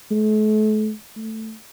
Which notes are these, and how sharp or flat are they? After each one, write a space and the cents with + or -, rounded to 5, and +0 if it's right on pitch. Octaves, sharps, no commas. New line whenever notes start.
A3 -40
A3 +5